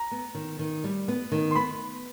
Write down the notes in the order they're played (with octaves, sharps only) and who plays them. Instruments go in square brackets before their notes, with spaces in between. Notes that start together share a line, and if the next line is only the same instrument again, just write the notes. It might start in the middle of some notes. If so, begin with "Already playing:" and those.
Already playing: [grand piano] A#5
[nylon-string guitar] B3
D#3
D#3
G3
B3
D#3
[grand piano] C6
[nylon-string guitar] B3 [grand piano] B5